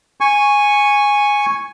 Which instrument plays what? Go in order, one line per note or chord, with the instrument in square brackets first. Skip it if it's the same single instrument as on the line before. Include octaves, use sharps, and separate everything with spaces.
[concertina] G#5 C#6